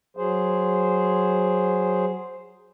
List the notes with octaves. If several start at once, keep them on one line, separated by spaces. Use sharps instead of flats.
F#3 G#4 C5